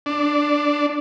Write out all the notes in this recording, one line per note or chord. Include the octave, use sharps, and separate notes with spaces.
D4